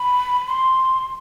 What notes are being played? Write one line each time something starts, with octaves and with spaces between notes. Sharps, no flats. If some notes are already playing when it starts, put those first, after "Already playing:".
Already playing: B5
C6